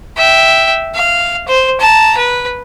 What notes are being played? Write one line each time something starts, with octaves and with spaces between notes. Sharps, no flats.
E5 G5
F5
C5
A5 A#5
B4